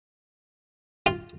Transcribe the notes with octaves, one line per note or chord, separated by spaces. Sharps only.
F4